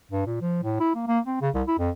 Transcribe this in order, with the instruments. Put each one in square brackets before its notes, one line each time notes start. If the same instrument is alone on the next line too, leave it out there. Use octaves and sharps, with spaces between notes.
[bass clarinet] G2
A#2
F3
A2
E4
A#3
A#3
C4
C#3
C2
E4
F2